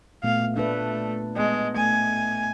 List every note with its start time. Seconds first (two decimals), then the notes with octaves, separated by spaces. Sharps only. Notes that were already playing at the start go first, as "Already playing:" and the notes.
0.24 A#2 A3 B3 F5
0.57 A3 D4 B4
1.36 G#3 B3 D#5
1.76 A3 G#5